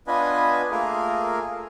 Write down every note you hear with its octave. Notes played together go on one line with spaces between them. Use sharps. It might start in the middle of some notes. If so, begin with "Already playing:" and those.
B3 D4 F4 B4 D#5 G#5
A3 A#3 F4 G#4 A#4